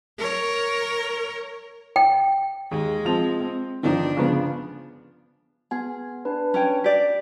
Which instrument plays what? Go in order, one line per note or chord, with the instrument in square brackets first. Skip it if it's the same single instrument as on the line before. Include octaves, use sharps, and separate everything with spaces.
[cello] A#4 C#5
[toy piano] G5
[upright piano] D#2 [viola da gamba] G#3 [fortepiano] G#4
[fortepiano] F3 [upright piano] C4 A5 F7
[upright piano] C4
[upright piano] G1 [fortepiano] D#3 F3 D#4 [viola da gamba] D4
[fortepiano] C#3 F3 B3
[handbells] B3 [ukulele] G#4
[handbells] D4 B4
[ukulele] C#4 C#5 G5
[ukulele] G4 D5 [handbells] B6